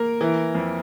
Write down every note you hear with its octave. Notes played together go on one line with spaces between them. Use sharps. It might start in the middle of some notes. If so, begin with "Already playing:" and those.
Already playing: A#3 A#4
E3
F2